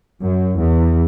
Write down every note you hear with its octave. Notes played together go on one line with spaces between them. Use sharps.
F#2
E2